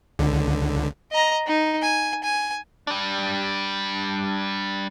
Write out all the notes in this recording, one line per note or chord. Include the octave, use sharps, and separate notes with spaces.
C#2 D3
D#5 A#5
D#4
G#5
G#5
G3 D4